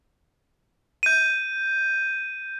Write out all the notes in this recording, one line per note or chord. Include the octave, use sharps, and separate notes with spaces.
G6 D#7